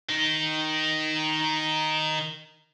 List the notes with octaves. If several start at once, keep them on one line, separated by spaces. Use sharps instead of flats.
D#3 D#4